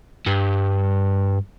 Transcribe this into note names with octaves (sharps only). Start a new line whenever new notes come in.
G2